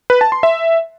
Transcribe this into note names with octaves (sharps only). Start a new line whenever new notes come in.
B4
A5
C6
E5